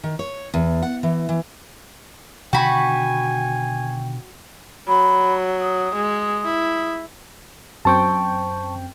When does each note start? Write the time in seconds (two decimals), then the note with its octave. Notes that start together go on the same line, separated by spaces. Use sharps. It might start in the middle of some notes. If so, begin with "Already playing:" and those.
0.03 D#3
0.19 C#5
0.54 E2
0.82 F#5
1.03 E3
1.29 E3
2.53 B2 D3 D#3 F#4 G5 G#5 B5
4.88 F#3 B5
5.61 D#6
5.96 G#3
6.45 E4
7.85 F#2 C4 G5 A5 C#6